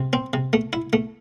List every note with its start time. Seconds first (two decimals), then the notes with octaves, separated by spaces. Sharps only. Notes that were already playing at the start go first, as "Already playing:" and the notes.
Already playing: C3
0.13 C4
0.33 C3
0.53 A3
0.73 E4
0.93 A3